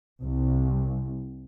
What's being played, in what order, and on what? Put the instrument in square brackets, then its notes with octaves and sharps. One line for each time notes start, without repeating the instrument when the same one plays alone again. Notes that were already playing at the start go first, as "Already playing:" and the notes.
[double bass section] C2